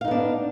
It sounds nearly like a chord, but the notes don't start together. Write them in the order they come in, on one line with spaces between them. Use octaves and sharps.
F5 D#4 B3 D4